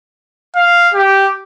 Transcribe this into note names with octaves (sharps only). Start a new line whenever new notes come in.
F5
G4